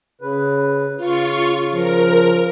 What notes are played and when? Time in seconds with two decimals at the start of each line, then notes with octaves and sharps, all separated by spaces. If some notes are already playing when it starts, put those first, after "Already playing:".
0.21 C#3 B4
0.97 C#3 F4 C#6
1.73 F3 A#4